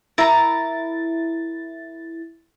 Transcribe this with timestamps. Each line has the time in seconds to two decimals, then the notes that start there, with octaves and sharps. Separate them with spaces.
0.18 E4 A#4 A#5 A6